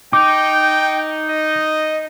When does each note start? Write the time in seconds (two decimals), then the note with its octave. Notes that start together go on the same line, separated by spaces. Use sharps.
0.13 D#4 G5 D6
1.29 D#5